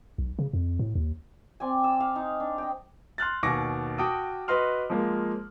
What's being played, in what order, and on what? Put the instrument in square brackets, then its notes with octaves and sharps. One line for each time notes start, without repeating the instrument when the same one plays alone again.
[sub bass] B1
C#3
F2
A2
D#2
[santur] C4 D5 G#5
D6 E6
F5
D#4
D4
D#5 G5
[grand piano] C6 F6 F#6 A6
D#2 B2 G#5 C#6 D6 A#6
F#4 G5 A5 D6 D#6
F#4 B4 D#5 C6 F6
F3 G#3 A#3